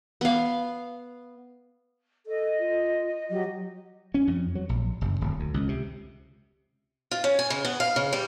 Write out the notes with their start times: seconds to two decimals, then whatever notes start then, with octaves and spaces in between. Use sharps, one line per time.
0.21 B3 F5
2.26 A4 D#5
2.59 F4
3.30 F#3 G4 D#5
4.14 C#4
4.27 F2
4.55 F#3
4.69 A#1
5.01 F#1
5.21 D1
5.40 D2
5.54 C#2
5.69 C3
7.11 F4
7.24 C#4
7.39 G#5
7.50 C#3
7.65 B3
7.80 F5
7.96 C#3
8.13 G3